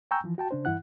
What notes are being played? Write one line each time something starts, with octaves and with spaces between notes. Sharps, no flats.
G5 G#5 A#5 C#6 E6 G6
E3 F3
F#4 G5 A5
C#3 D4 C5
G2 E3 E4 F#5 F#6